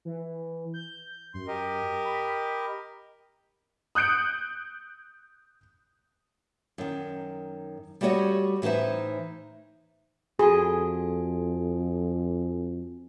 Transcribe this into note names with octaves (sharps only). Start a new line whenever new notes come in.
E3
G6
F#2 C6
G4 A#4 D#5
B5
D#6 F#6 G6 C#7 D7
F#2 D#3
G3 A3 F#4 G4 C#5 D#5
A2 E3 D#4 C5 E5
F2 F#4 G#4 A4 G#5